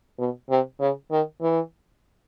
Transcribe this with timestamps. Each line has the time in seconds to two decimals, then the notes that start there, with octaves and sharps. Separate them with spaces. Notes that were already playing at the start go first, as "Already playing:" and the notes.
0.19 B2
0.49 C3
0.80 C#3
1.11 D#3
1.41 E3